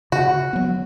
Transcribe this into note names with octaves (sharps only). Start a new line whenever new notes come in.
C#3 F#4
F#3 B3